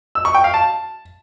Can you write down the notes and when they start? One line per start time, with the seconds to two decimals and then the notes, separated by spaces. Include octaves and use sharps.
0.15 E6
0.25 C#6
0.35 G5
0.44 F5
0.54 A5